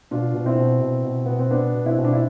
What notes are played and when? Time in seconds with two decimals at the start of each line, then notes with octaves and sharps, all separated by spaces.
0.11 B2 D4 F4
0.34 B2
0.46 C4 E4
0.59 B2
0.81 B2
1.04 B2
1.26 B2 B3
1.39 C4
1.51 B2 B3 D4
1.74 B2
1.86 C4 E4
1.97 B2
2.05 D4
2.13 E4